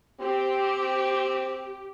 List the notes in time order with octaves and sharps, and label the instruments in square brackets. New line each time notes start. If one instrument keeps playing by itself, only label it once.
[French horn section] C4 [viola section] G4